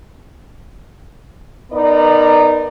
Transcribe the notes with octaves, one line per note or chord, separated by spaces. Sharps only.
B3 D#4 A#4 D5